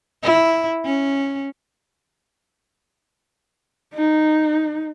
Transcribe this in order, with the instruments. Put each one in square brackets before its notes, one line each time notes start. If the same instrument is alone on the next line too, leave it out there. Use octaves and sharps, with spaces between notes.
[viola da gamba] E4
C#4
[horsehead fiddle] D#4